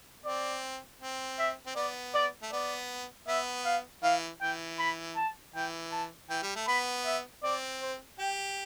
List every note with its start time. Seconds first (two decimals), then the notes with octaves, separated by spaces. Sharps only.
0.25 C4 D5
1.00 C4
1.38 E5
1.66 C4
1.76 B3 D5
2.14 D5
2.42 A3
2.52 B3 D5
3.27 B3 E5
3.65 F5
4.03 E3 F5
4.41 E3 G5
4.79 B5
5.16 A5
5.55 E3 G5
5.92 A5
6.30 E3 G5
6.42 G3
6.56 A3
6.67 B3 B5
7.05 E5
7.43 C4 D5
7.82 C5
8.18 G4 G5